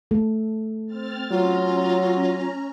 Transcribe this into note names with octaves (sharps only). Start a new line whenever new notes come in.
A3 A4
C4 F6 A6
F#3 C#4 F4 A#5